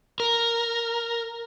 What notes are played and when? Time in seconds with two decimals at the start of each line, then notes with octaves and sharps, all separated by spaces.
0.20 A#4